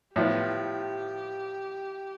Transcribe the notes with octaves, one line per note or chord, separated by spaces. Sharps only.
A2 F3 B3 G4